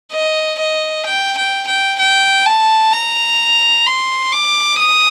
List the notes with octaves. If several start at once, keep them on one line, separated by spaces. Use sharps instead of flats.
D#5
D#5
G5
G5
G5
G5
A5
A#5
C6
D6
D#6